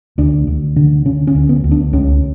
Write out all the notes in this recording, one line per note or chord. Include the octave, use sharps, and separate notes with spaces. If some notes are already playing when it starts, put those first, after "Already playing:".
D2 D4
D2
D3
D3 C#4
C#4
D2
B3
D2
D4
C#2 C#4